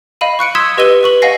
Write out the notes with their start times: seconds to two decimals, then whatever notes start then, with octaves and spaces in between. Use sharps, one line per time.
0.21 D#5 F5 B5 D#7
0.39 C#6 F#6 C#7 D7
0.55 C6 D#6 E6 G#6 B6 E7
0.77 G4 B4 D#5 E6 D#7 G7
1.03 B4 C#6 F#7
1.22 D#5 F5 F#5 G#5 A#6 C7